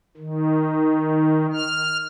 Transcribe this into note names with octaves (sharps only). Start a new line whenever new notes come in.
D#3
F6